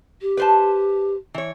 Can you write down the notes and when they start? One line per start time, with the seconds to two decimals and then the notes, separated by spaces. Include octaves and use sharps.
0.21 G4
0.37 B4 C5 A5
1.34 E3 C#5